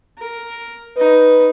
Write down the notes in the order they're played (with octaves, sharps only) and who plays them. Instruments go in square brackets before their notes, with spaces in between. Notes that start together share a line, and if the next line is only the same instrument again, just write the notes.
[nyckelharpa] A#4
[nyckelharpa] D#4 [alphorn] B4